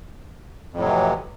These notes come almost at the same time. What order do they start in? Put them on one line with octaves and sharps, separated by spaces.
F2 A2 F#3 C3 E3